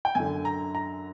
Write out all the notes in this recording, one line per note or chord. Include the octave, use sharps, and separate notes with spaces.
G5
F#2 D3 G#5
A#5
A#5